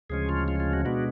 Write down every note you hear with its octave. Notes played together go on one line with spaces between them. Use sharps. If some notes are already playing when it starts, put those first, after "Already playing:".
D2 C#3 F3 G#3 C#4 G#4
F4
F4
F4
F#4
B2 G#3 B3 D4 F#4